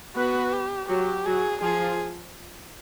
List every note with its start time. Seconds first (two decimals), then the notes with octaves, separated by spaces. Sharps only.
0.15 B3 F#4 B4
0.53 G4
0.88 F#3 F#4 G4
1.26 F#3 F#4 G#4
1.61 F3 F4 G#4